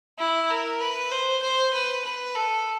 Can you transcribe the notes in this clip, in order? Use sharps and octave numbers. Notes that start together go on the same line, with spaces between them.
E4
A#4
B4
C5
C5
B4
B4
A4